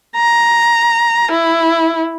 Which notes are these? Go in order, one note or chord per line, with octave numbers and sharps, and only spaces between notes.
A#5
E4